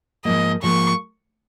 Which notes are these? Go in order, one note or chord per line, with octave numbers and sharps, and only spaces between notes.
G#2 F3 A#3 D#5
G#2 F3 A#3 C#6